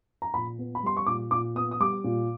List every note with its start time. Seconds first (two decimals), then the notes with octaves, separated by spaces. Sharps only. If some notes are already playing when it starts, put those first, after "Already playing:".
0.22 A#5
0.34 A#2 B5
0.58 B3
0.75 B5
0.83 G3 C6
0.97 C#6
1.07 A#2 D6
1.31 A#2 D6
1.55 B3 D#6
1.71 D#6
1.80 G3 D6
2.04 A#2